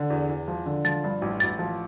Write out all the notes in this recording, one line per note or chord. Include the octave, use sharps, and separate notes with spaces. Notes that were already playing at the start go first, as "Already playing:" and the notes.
Already playing: D3
E2
E2
F3
D3
F3 A6
G2
A1
A1 A6
F3